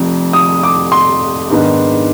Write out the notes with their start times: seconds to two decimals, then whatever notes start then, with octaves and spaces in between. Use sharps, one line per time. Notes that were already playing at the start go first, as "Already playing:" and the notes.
Already playing: F1 F2 F3
0.33 D#6
0.63 D6
0.92 C6
1.50 G#2 D#3 B3 D4